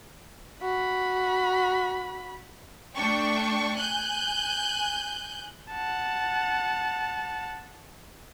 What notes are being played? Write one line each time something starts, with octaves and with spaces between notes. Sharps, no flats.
F#4 B5
A3 D4 G5 C#6
G#5 F#6 G6
F#5 A5